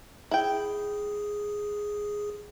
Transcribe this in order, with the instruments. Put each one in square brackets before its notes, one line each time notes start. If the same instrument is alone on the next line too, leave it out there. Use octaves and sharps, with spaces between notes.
[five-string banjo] E4 G5 [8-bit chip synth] G#4